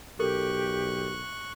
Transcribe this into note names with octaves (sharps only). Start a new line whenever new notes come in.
B1 G4 A4 A#4 C#6 F#6